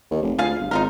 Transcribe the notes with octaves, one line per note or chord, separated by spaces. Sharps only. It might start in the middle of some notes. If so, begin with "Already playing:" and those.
D#2
F1
D2 F4 G#4 F5
G1
G#1 D#4 F4 A#4